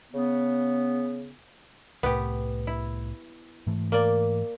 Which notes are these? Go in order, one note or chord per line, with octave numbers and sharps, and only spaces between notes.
C#3 B3
C2 A2 B3 G4
E4
G#2 E3 A3
A#3 D5